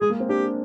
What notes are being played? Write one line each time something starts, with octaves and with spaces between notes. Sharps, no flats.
G#3 G#4
A#3
C4
D4 G4